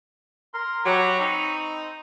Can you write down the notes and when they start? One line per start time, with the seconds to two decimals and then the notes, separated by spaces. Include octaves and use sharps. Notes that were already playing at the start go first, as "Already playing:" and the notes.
0.54 A#4 C6
0.86 F#3 G4 B5 C#6
1.19 C4 D#4